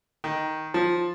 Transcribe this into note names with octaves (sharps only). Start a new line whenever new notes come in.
D#3
F3